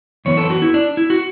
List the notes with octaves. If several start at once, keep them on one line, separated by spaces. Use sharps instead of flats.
F#2 E3 B3 C#5
A4
F#4
E4
D4
E4
F#4